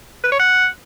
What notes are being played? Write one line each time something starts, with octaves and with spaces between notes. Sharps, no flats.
B4
C#5
F#5